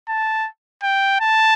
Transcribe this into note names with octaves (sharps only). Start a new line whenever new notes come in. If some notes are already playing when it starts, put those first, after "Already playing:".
A5
G5
A5